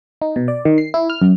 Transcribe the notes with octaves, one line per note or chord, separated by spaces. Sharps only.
D#4
B2
D5
D#3
C7
E4
F6
F#2